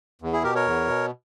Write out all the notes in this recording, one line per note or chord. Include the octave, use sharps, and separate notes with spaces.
E2
E4 G#4
B2 G4 A#4
A#4 C#5
E2
B2